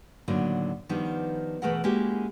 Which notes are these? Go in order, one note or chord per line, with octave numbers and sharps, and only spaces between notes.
A2 D3 D#3 F#3 A#3
D#3 F3 G3 B3 D4 D#4
B2 E3 A3 G#4 A#4 F#5
G#3 A#3 C#4 E4 F#4 G4